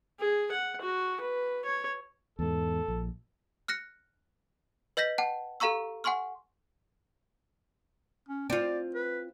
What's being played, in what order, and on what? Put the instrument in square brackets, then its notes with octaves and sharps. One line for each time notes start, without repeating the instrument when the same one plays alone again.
[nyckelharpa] G#4
F#5
F#4
B4
C#5
[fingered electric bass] E2 G#2 [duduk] A4
[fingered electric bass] A#1
[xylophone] F6 F#6 A#6 C#7
B4 D#5 G6 A#6 B6
F#5 G5 A5
G4 A4 F5 A#5 C#6 E6
F#5 G#5 C6 C#6 F6
[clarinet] C#4
[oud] C4 F4 [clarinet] D5
[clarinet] B4